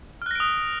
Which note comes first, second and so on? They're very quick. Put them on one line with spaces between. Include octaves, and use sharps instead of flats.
F6 F#6 A#6 D7 D#6